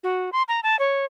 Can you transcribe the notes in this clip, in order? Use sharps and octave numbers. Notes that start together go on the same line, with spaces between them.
F#4
C6
A#5
A5
C#5